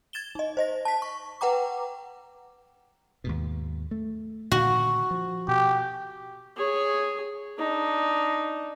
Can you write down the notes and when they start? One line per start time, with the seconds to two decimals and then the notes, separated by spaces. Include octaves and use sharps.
0.13 G#6 A6 E7 G7
0.35 D#4 D#5
0.57 C5 D#5 A#6
0.85 A5 B6
1.02 C#6
1.41 B4 F#5 G5 A#5 D6
3.24 D#2 G#2 B2
3.91 A3
4.52 A#2 D3 D#3 F#4
5.11 F3
5.48 B2 G4
6.57 G#4 C#5
7.59 D4 D#4